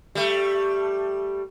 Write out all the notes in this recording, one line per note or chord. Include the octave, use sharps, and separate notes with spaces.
G3 A3